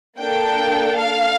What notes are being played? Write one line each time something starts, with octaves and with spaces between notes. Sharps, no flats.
A#3 D4 A4 G5
F5